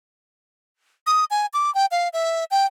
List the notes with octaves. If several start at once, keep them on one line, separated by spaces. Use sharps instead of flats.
D#6
G#5
D6
G5
F5
E5
G5